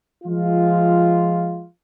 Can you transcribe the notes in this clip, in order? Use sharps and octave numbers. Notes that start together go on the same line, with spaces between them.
F3 G#3 F4